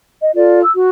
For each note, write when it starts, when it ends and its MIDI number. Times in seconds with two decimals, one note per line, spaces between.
0.21 0.31 75
0.36 0.61 65
0.36 0.61 69
0.36 0.61 74
0.63 0.72 88
0.74 0.90 66